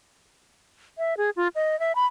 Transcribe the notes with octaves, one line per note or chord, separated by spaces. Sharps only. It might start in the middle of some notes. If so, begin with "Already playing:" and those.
E5
G#4
F4
D#5
E5
B5